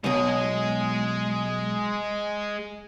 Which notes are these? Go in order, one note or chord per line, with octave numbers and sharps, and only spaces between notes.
B1 B2 G#3 D#5